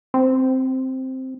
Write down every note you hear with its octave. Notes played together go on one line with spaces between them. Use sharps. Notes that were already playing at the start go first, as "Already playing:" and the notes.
C4